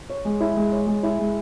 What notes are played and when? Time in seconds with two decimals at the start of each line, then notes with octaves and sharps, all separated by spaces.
0.10 C#5
0.25 G#3
0.40 E4
0.57 G#3
0.72 C#5
0.87 G#3
1.03 E4
1.19 G#3